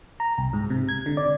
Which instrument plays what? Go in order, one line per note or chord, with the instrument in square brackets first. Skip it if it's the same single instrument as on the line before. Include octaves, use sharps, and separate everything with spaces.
[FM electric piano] A#5
C2
G#2
C3
G#6
D3
D5